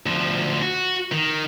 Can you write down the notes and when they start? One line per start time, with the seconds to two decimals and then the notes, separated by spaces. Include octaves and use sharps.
0.06 D2 F3
0.62 F#4
1.12 D#3